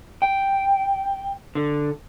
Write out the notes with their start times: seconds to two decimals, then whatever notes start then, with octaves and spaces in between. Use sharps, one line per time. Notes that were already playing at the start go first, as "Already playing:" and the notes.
0.22 G5
1.55 D3